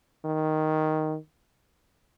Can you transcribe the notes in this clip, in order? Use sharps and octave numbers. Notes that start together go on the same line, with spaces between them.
D#3